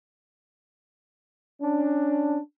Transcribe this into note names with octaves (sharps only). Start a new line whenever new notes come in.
C#4 D4